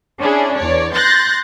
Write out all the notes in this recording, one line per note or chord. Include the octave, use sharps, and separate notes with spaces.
C#4 D4 E4 G#4
E2 C#5 D5
C6 F#6 G6 A6 A#6